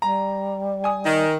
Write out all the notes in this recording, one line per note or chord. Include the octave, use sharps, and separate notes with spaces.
G3 A#5
G#5 D#6
D#3